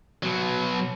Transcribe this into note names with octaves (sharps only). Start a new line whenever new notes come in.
B2 F#3